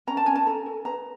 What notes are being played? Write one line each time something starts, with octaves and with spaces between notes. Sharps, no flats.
C#4 A#5
A5
C#4 G#5
A5
A4 A#5
A4
B4 A#5